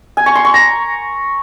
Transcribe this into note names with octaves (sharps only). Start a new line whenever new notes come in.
G#5
C#6
C6
C#6
A#5